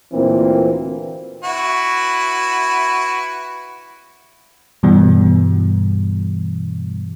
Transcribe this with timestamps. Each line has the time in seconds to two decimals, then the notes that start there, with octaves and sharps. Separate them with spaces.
0.12 D2 A#2 E3 A#3 C4
1.44 E4 F#4 B4
4.83 G2 B2 E3 G3